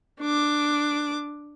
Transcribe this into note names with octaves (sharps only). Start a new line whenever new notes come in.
D4 D6